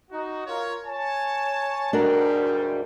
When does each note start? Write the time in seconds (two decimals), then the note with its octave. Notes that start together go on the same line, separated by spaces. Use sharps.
0.11 D#4 F#4
0.47 F4 A#4 C#5
0.86 C#5 G#5 A5
1.93 D2 G#2 G3 D4 F#4 A#4